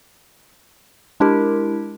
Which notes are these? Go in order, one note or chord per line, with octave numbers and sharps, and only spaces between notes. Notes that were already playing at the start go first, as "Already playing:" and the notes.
G#3 D4 E4 G4 A#4